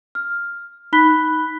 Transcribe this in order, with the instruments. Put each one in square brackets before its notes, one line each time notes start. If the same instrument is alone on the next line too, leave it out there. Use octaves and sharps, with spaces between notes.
[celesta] F6
D#4 B5 F#6 B6 G7